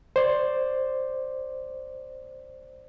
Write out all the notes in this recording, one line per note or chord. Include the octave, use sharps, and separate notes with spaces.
C5 D5